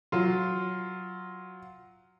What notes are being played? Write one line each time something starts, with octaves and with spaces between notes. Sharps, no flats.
F#3 F4